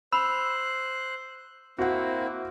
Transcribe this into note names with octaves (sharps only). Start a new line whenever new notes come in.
C5 B5 E6 F#6
A#3 C4 E4 F#4 F#5